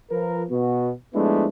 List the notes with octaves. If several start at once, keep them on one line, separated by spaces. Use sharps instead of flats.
F3 A#4 B4
B2 B3 F#4
F3 G#3 A3 B3 D4 E4